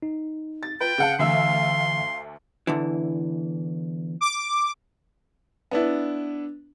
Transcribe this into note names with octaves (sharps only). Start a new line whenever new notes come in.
D#4
A6
F4 B4 G5
C#3 F5 F#5 A5
D2 D3 E3 E5 F5 C6 E6
E2 D3 E3
D6
B3 D4 E4